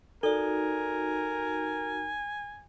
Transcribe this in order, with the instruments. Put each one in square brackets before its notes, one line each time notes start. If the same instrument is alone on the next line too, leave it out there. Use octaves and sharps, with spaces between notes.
[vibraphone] D#4 F#4 [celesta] A4 D5 [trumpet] A#4 [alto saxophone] G#5